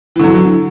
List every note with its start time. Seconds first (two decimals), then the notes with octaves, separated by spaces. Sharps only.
0.16 E3
0.20 D3
0.23 F#3